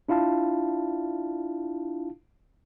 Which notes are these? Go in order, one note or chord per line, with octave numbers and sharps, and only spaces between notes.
D4 E4 F4 F5 A5